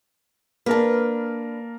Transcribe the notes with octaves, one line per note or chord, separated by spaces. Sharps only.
A#3 D4 A#4 B4 A5